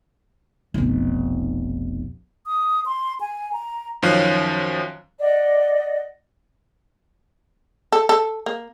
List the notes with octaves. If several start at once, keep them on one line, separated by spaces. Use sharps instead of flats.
F1 B1
D#6
C6
G#5
A#5
F#2 D#3 F3 C#4 F5 F#6
D5 D#5 F#5
A4
A4
A#3